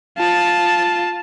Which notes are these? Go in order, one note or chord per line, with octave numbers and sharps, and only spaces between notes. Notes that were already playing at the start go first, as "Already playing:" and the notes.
F4 A5